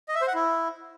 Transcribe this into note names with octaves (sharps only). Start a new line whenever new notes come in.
D#5
E5
C5
F#5
E4